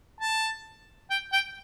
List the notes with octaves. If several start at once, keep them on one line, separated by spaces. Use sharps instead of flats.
A5
G5
G5